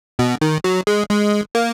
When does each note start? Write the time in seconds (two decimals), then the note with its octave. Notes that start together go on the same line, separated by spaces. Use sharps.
0.19 B2
0.41 D#3
0.64 F#3
0.87 G#3
1.10 G#3
1.55 A#3